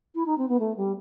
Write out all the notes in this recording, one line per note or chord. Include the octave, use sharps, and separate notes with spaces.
E4
D#4
C4
B3
A3
G3